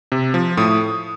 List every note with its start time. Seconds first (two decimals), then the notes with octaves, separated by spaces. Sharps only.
0.12 C3
0.34 F3
0.57 A2 D#6